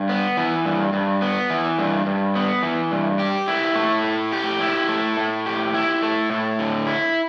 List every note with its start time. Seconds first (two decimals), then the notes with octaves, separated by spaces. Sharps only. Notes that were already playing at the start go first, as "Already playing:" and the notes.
Already playing: G2
0.09 B3
0.37 E3
0.65 G2
0.93 G2
1.22 B3
1.50 E3
1.79 G2
2.06 G2
2.35 B3
2.63 E3
2.91 G2
3.19 G4
3.48 E4
3.75 A3
4.04 A2
4.32 G4
4.60 E4
4.89 A3
5.17 A2
5.46 G4
5.74 E4
6.03 A3
6.30 A2
6.59 D3
6.87 E4